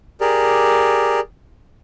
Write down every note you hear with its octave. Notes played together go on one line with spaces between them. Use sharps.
G4 G#4 A#4 D5